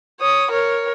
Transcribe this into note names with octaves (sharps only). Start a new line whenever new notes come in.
C#5 D#6
A#4 C#5